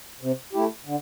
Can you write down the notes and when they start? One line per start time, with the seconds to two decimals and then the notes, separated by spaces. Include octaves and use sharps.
0.21 C3
0.53 A3 E4 G4
0.85 D3